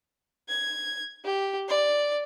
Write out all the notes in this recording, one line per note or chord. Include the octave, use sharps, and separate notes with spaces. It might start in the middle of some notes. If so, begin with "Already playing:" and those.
G#6
G4
D5